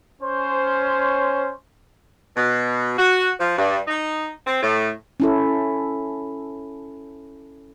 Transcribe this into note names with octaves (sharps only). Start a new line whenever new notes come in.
C#4 C5
B2
F#4
F3
G2
D#4
C4
A2
C#4 E4 A4